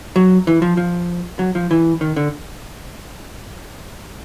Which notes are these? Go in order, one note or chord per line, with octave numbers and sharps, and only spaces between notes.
F#3
E3
F3
F3
F#3
F3
E3
D#3
D3